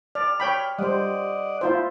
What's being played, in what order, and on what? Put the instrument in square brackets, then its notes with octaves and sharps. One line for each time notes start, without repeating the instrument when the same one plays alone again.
[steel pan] D5 [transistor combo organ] F6
[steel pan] C#5 G5 B5
[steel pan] G3 C5 [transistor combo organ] D5 D#5 F#5
[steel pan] E4 F4 C5